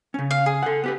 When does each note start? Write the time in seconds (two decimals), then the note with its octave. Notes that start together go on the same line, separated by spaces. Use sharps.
0.14 C#3 C#4
0.31 F5
0.46 G#4
0.62 A4 F#5
0.84 B3 G4 B4